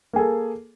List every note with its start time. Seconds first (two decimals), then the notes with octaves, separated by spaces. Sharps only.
0.13 A#3
0.16 G#4
0.19 A4